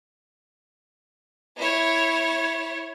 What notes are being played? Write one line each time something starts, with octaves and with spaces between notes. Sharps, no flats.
E4 C#5